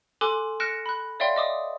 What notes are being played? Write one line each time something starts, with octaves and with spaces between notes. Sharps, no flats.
A4 G#5 C6 D6 F#6
F6 F#6 A#6 C#7 D7 E7
B5 F#6
C#5 D5 E5 F5 G5 C6
D#5 D6 D#6